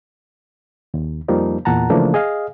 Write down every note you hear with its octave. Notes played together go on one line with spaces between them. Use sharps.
D#2
F2 F3 G3 A#3 D#4
E2 A#2 F#5 A5 A#5
C#3 E3 F3 A3 A#3 D4
G#4 D#5 F5